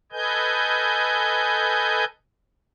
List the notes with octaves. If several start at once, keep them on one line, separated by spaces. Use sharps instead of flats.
A4 B4 D#5 G#5 G6